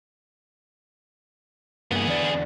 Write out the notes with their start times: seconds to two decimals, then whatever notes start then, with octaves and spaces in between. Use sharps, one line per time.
1.91 G2 A#3 B3 G#4
2.08 E2 D3 D5